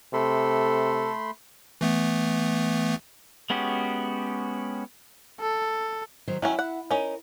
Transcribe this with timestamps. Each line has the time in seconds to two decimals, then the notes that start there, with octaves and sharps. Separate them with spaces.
0.13 C3 A3 A4 B5 C6
1.81 E3 A3 B3
3.50 G#3 B3 C#4 F#4 G4
5.40 A4
6.28 D#3 F#3 C5
6.42 D#3 F#3 C#4 E4
6.59 F#5
6.91 C#4 D#4 A#4